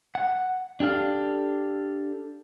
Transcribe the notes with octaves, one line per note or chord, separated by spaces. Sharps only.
F#5
D4 G4 A4 F5